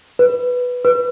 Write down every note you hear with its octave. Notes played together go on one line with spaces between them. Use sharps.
B4
B4